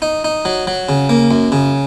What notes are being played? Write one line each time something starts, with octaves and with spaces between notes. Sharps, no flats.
D#4
D#4
F#3
F#3
C#3
A#3
F#2
C#3